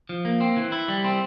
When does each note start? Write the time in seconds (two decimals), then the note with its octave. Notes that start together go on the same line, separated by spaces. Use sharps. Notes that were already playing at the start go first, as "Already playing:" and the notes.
0.09 F3
0.25 A#3
0.40 C4
0.57 E3
0.72 E4
0.88 G3
1.04 C4